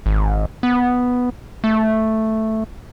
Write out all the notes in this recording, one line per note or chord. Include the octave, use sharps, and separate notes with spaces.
G#1
B3
A3